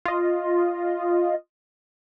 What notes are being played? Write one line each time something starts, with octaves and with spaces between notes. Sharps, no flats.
F4 D#5